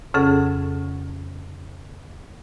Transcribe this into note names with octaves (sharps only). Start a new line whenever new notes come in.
F2 C#3 C#4 G#4 A4 F#5